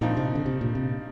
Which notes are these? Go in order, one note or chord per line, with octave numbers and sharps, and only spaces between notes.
G2 A#2 F3 C4 D#4
C3
D3
C3
A#2
C3